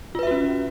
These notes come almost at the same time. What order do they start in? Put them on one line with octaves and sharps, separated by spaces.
F4 B4 E5 F#4 C#4